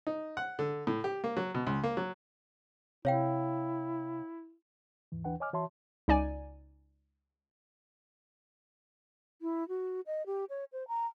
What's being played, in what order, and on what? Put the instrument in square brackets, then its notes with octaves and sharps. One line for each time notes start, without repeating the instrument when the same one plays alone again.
[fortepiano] D#4
F#5
D3
A2
G4
A#3
F#3
B2
C#2
A#3
F#3
[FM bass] C3 [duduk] E4 [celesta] C#5 F5 G5
[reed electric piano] D#2 G#2 E3
D#2 E3 D4 B4 F#5 G5
C#5 D#5 G#5 D6 F6
E3 F#4 C#5 E5 A5 C6
[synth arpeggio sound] C#2 D#4 D5 G#5
[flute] E4
F#4
D#5
G4
C#5
C5
A#5